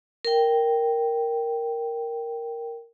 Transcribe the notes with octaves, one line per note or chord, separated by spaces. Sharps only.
A#4 G5